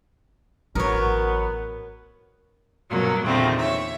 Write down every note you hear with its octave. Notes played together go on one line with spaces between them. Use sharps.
A1 F#3 B3 A#4 C#5
G2 B2 F#3 A#3
E2 A#2 D3 D#3 A3 C4
C#5 E5